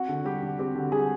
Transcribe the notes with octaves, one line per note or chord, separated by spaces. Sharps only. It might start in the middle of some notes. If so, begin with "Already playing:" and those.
Already playing: C4 F#4
D3
G3 G4
D3
C4 G4
D3
G3 G#4